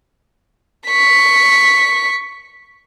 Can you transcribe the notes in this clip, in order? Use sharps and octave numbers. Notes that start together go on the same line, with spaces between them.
C#6 B6